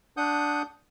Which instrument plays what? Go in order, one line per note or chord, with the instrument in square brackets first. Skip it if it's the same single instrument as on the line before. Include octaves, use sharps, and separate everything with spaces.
[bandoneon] D4 F#5 D#6 G6